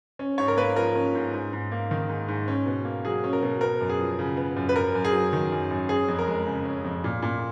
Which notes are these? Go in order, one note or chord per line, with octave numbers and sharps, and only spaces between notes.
C#4
G#2 C#5
A#4
A#3 B4
F3 A#4
C#4
G#2
G#2
G#2
A#3
D#3
G#2
G#2
C#4
B2
A#3
F#3 G#4
C#4
A#4
B2
B3 A#4
F#2
G#4
F3
C#3
B3
F#2
B4
F#2 A#4
F#2
G#4
F#3
D#3
F#2
F#2
C#4 G#4
F2
A#4
G#3
C#3
C#4
F2
A#2
A#2